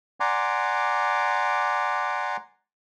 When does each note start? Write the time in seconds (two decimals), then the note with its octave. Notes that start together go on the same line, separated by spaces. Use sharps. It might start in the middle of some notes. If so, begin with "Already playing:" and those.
0.20 D5 F#5 G#5 A#5 C6 D6